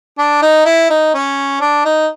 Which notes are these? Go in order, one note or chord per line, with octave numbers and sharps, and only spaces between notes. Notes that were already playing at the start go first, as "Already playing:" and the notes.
D4
D#4
E4
D#4
C#4
D4
D#4